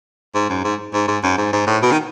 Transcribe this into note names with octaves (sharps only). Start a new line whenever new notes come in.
G#2
F#2
G#2
G#2
G#2
F#2
G#2
G#2
A2
B2
D#3